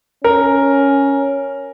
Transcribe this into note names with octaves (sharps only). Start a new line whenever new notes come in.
C#4 A#4